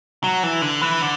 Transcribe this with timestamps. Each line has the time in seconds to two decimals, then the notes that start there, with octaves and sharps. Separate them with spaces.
0.24 F#3
0.43 E3
0.62 D3
0.81 E3
1.01 D3